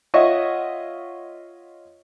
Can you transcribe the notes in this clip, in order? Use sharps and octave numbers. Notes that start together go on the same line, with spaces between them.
F4 C#5 D#5 E5 F#5 C#6